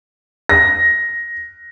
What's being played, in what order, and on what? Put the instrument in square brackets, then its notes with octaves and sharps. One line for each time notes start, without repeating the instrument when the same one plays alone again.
[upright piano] A#6